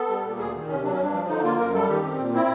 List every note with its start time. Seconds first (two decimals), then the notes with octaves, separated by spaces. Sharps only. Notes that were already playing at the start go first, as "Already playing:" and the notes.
Already playing: B3 A4
0.08 G3
0.23 A#2
0.38 D2 G#4
0.54 D#3
0.68 C3 C#4
0.83 F#3 D4
0.93 C#4
0.99 G2 D4
1.14 F3
1.28 D3 D#4
1.43 A#3 F4
1.58 F#2 A#4
1.74 G3 A4
1.89 D#3 G4
2.03 C4
2.18 A#2
2.34 C4 E4